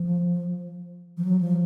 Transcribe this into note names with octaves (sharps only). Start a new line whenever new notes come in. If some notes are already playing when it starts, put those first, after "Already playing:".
Already playing: F3
F3
F#3
F3